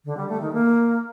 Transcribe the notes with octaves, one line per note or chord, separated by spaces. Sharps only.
D3
G3
A3
D#3
A#3